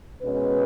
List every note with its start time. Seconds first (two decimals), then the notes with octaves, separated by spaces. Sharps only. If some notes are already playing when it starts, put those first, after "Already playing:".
0.23 B2 G#3 C#4 B4